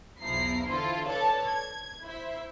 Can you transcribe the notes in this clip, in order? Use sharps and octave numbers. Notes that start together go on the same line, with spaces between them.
B1 E2 F3 E4 A#5 C7
D3 E3 E4 F4 A4 C5
A4 B4 C#5 D5 A5
G#6
E4 C5 E5